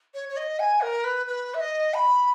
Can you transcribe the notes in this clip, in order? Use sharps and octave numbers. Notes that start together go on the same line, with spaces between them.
C#5
C#5
D#5
G#5
A#4
B4
B4
E5
D#5
B5